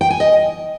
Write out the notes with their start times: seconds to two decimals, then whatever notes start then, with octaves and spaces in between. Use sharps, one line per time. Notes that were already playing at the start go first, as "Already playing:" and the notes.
0.01 G5
0.10 G#5
0.20 D#5